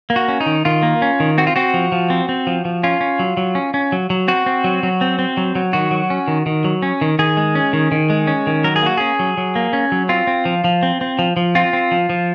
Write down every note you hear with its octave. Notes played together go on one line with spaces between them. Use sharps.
A#3
F#4
C#4
D#4
D#3
D#3 F4
A#3
C#4
D#3
C4 F#4
F4
C4 F#4
F3
F3
C4
C4
F3
F3
C#4 F4
C#4
F#3
F#3
C#4
C#4
F#3
F#3
C4 F#4
C4
F#3
F#3
C4
C4
F#3
F#3
D#3 F#4
F#3
C#4
D#3
D#3
F#3
C#4
D#3
D#3 G#4
G#3
C#4
D#3
D#3
G#3
C#4
D#3
F#3 A#4
G#4
A#3 F#4
C#4 G#4
F#3
F#3
A#3
C#4
F#3
C4 F4
C4
F3
F3
C4
C4
F3
F3
C4 F4
C4
F3
F3